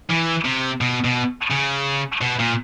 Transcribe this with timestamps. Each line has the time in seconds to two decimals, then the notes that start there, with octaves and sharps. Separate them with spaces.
0.10 E3
0.45 C3
0.81 B2
1.04 B2
1.51 C#3
2.21 B2
2.39 A#2